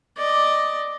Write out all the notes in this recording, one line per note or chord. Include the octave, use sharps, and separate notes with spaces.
D5 D#5